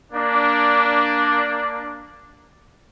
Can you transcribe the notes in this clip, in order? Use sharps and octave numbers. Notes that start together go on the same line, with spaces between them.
A#3 D4